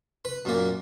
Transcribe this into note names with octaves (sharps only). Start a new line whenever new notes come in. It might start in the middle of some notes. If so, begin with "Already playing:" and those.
B4
F#2 A#2 A#3